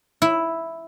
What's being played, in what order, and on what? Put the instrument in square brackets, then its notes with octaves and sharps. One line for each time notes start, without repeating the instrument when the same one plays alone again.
[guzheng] E4